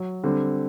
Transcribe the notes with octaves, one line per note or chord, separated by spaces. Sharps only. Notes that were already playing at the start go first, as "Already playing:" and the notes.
Already playing: F#3
D3 G3 C4